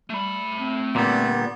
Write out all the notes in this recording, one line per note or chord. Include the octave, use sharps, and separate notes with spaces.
G3 A3 B5
C4
A#2 D3 G3 B3